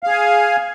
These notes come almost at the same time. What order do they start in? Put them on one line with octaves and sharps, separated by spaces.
F5 G#4 G#5